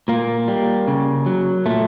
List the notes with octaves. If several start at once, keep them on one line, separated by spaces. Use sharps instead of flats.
A#2 A#3
G3
C#3
F#3
A#2 A3